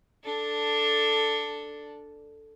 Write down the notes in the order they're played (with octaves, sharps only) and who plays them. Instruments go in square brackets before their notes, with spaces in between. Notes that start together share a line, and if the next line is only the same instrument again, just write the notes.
[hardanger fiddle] D4 A4